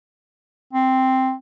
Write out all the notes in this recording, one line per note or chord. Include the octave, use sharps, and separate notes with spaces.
C4